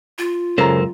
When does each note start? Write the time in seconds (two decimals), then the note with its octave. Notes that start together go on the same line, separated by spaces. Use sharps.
0.18 F4
0.58 C#2 F#2 C#3 A4 A#4 C5 A#5